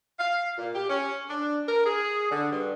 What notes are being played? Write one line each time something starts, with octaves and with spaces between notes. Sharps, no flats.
F5
A#2
G4
C#4
D4
A#4
G#4
D3
G2